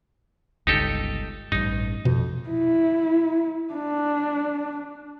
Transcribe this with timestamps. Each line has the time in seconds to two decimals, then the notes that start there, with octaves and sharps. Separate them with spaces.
0.67 G1 C#2 D#4 G4 A4
1.52 A1 G2 D#4
2.05 F2 B2
2.49 E4
3.74 D4